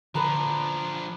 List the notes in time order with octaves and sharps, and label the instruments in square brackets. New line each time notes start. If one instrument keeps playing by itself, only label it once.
[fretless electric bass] D3 [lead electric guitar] F3 D4 [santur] A4 B4 C5 [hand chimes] A#5